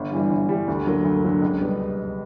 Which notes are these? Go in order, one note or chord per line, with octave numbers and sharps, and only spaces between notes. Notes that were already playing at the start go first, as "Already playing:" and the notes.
Already playing: G1
G2 E3 G3
G1
G2 E3 G3
D2
D3 F#3 A#3
D2
D3 F#3 A#3
C#2
B2 G3 B3